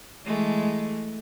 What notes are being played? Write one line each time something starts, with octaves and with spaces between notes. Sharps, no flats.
E3 G#3 A3